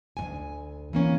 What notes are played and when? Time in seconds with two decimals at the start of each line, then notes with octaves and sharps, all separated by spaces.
0.17 D2 G#2 G#5
0.93 E3 A#3 C#4